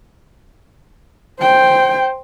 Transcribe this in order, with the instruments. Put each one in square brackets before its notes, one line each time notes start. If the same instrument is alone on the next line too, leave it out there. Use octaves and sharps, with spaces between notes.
[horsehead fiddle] C5 G5